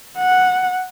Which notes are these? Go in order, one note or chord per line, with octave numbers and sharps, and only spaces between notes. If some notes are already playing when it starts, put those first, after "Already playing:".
F#5